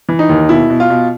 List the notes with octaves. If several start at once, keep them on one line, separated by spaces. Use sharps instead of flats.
E3
D#4
D#2
B2 E4
B2
F4
B2